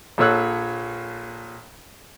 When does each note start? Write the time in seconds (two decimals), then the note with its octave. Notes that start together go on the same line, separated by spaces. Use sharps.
0.18 A#1 A#2 A4 C#5 E6 F#6